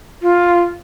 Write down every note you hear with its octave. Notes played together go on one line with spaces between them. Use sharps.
F4